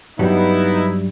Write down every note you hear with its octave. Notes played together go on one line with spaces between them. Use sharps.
G2 F#3 G3 B3 D#4 E4